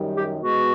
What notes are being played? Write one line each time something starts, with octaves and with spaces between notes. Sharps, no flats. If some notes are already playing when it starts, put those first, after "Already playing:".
Already playing: F#2 D#3 G3
G4
B2 G#3 F#4